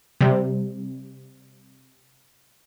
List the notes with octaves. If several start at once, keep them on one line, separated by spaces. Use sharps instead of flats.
C3 G3